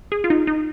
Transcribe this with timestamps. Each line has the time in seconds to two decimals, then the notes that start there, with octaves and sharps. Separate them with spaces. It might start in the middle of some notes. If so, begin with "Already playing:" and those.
0.12 G#4
0.24 F4
0.30 D#4
0.47 D#4